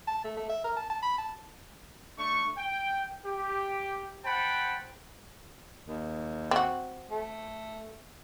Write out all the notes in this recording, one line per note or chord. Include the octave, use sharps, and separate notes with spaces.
A5
A3
A3
E5
A#4
A5
A5
B5
A5
A3 D4 C#6
G5
G4
C5 F#5 G5 A5 B5
D#2
C4 F#4
A3